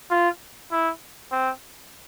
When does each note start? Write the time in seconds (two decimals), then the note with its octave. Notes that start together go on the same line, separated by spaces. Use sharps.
0.11 F4
0.72 E4
1.32 C4